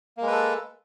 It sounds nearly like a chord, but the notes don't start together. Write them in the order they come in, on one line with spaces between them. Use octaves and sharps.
A#3 G#3 B4 A4